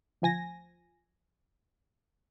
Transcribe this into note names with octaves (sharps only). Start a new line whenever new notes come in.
D2 F3 G#5 A#6